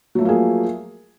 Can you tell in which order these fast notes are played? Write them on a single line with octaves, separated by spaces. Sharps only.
F#3 A3 F3 A#3 G#4